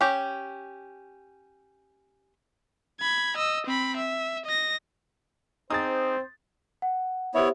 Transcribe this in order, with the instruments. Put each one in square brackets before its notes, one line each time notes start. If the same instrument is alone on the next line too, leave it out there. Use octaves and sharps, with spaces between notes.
[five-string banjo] C#4 G4
[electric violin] B5 G#6
D#5 E6
C4 B5
E5
D#5 A#6
[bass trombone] C4 [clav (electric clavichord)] D#4 G#4 [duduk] C5 [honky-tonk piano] D#6 A6
[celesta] F#5
[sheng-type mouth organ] B3 E4 C#5 [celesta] G4 C5 E5